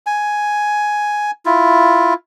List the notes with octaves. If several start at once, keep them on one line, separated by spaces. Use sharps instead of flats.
G#5
E4 F4